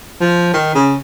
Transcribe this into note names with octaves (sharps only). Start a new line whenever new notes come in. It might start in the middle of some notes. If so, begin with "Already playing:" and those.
F3
D#3
C#3